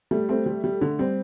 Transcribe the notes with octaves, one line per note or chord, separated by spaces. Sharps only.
G3 A3
A3 C4
G3
G3
D3
G3 C4